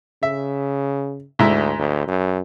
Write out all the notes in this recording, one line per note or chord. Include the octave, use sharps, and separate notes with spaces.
C#3 E5
D2 G#2 E4
D2
F#2